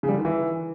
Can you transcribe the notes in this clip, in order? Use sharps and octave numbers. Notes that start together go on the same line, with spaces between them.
C#3
G3
D3
D#3
E3